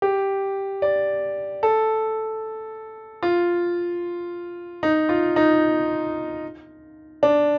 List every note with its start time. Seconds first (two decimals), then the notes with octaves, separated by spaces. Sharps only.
0.02 G4
0.82 D5
1.63 A4
3.23 F4
4.83 D#4
5.09 F4
5.36 D#4
7.23 D4